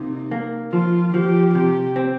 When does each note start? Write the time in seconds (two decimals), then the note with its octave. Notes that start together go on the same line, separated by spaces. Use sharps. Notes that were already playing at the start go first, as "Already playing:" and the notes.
Already playing: C3 A#3 D#4
0.31 A#3
0.73 F3 F4
1.14 F3 G4
1.55 C3 G4
1.96 C4